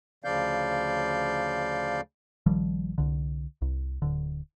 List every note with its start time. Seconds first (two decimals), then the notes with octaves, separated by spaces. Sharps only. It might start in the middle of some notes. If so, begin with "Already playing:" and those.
0.24 D2 C#3 F3 D5 F5 G6
2.46 A#1 D#3 F3 G3
2.98 C2 D3
3.62 C2
4.02 D1 D3